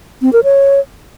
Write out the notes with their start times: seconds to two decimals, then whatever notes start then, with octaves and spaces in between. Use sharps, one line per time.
0.22 C4
0.33 A#4
0.44 C#5